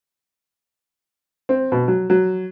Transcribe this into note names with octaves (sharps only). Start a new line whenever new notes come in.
C4
B2
F#3
F#3